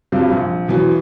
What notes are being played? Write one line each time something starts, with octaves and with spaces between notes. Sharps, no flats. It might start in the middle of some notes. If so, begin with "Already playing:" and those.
G2 C3 F3 F#3
A#1
B2 E3 F#3